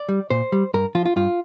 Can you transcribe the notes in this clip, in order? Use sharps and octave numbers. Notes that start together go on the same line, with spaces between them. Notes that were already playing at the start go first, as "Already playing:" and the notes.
Already playing: D5
G3
A#2 C5
G3
G2 A#4
F3 F4
F4
G2 F4